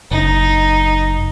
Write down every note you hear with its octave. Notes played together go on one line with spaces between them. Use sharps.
F#1 D#4